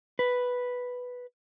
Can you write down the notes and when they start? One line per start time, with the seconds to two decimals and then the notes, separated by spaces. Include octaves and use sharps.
0.19 B4